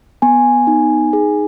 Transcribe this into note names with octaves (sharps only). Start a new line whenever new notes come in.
B3 G#5
D#4
G#4